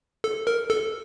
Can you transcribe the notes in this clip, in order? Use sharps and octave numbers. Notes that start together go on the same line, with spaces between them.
A4
A#4
A4